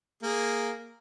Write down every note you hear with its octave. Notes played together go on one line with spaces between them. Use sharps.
A#3 G#4